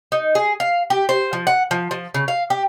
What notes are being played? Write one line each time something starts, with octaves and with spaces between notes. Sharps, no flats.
D#4
G#4
F5
G4
C5
F3
F#5
F3
F3
C#3
F5
G4